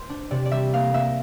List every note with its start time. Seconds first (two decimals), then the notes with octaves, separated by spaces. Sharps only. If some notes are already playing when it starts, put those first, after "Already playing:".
Already playing: C5
0.10 D4
0.31 C3 D5
0.46 D5
0.51 G3 E5
0.73 A#3 F5
0.94 A#3 E5